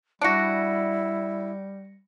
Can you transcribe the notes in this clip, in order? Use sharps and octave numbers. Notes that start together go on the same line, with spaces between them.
G3 D4 E4 F#4 A#6 C#7 D7